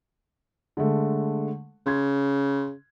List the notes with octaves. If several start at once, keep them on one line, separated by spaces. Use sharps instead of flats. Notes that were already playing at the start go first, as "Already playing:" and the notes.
D3 G#3 A3
C#3 C6 G#6